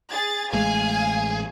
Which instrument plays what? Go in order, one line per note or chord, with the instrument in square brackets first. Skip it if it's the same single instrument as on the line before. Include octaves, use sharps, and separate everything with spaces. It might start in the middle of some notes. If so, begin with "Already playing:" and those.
[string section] G#4 A6
[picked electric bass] A1 G#3 A3 [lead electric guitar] G#4 [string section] F5 G#5